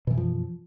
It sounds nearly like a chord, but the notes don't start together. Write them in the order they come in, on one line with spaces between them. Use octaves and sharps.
B2 E3 F#2 F3